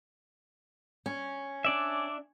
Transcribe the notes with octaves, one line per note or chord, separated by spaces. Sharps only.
C#4
D4 D5 E5